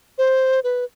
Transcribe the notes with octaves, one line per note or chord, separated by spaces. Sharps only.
C5
B4